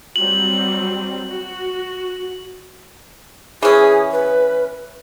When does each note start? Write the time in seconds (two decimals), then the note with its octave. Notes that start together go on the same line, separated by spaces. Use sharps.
0.16 F#3 G3 C4 F#7
1.29 F#4
3.63 E3 C#4 G#4
4.12 B4